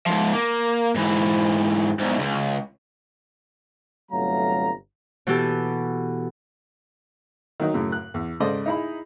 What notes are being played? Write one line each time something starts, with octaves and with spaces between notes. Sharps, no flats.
G#2 F3
A#3
G#2 E3
E2 G#2
C#2
G1 C3 F#3 A3 F5 A#5
B2 E3 B3 G4 A4
D#3 F#3 D#4
F#2 A2 C#3
F#6
E2
G#2 C#3 A4 C5 D5 D#5
D#4 E4 G#4 B5